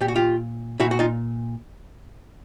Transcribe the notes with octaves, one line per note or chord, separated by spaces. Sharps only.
A#2 G4
F#4
F4 G4
A#2 E4 F#4
F#4
D#4 F4